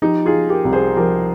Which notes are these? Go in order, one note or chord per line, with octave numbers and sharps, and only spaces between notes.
F3 D#4 G4
F4 G#4
F3
G4 A#4
C2
G#4 C5
F3 G4 A#4